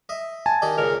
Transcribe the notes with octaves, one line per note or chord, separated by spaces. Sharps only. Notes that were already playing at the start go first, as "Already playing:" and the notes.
D#5 E5
G#5 A5
D#3 G4 D5 D#5
C#2 A#2 C#3 A#4